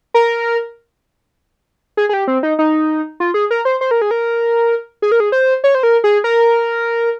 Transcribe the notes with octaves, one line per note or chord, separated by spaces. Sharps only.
A#4
G#4
G#4
G4
C4
D#4
D#4
F4
G#4
A#4
C5
C5
A#4
G#4
A#4
G#4
A#4
G#4
C5
C#5
C5
A#4
G#4
A#4